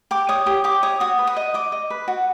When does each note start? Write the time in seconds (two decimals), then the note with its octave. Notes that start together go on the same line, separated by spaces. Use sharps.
0.11 G4 D6
0.29 C#5 D#6
0.46 G4 D#6
0.64 G4 D6
0.83 C#5 D#6
1.00 F#4 D#6
1.19 B4
1.27 D#6
1.36 D#5
1.54 D#5 D6
1.72 D#5
1.90 B4
2.08 F#4